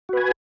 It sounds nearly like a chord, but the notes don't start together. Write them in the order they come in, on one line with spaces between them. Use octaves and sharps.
F#4 B4 G#5